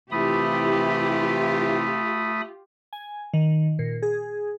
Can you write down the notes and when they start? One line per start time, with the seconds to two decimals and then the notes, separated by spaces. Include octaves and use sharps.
0.11 C3 E3 A3 E4 F4 G4 B5 D#6
2.93 G#5
3.33 D#3
3.79 A#2
4.02 G#4